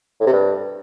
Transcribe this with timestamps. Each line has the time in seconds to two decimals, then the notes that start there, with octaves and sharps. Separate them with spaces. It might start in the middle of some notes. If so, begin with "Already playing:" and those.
0.20 A2
0.27 C3
0.33 G2